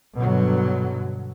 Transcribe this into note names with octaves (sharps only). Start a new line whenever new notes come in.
G2 B2 D3 F#3